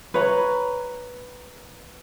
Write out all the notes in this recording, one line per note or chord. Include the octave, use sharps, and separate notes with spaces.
B4 C#5 A#5